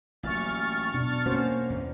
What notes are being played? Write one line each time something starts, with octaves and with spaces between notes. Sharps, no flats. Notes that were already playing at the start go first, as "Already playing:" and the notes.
A1 A#2 F#3 C#6 F6 A6
B2 D4
A#3 C#4 F#4 C5
E2